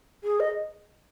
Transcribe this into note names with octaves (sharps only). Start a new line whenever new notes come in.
G#4
D#5